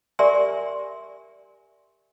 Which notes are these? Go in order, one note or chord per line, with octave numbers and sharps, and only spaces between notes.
G4 A#4 D5 E5 G#5 C6